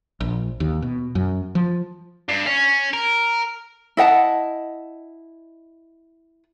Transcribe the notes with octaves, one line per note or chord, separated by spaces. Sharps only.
A#1
D#2
B2
F#2
F3
G2
C#4
A#4
E4 D#5 F#5 A5